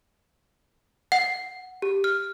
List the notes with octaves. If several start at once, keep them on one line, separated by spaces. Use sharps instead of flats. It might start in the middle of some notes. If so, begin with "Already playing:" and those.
F#5
G4
F6